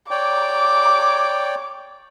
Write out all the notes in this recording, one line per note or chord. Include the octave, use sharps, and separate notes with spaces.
C#5 D5 G5 D6